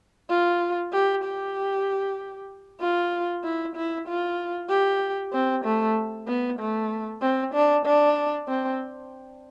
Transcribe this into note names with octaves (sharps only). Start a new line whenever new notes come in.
F4
G4
G4
F4
E4
E4
F4
G4
C4
A3
B3
A3
C4
D4
D4
C4